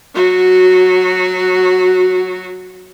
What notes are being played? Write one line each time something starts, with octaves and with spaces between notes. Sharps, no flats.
F#3 F#4